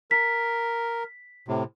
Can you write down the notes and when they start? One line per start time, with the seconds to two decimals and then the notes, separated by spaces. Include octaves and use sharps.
0.11 A#4 B6
1.48 A2 C3